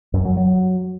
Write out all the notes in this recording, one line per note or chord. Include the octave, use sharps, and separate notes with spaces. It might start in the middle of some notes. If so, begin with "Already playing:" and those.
F#2
F#3
F#3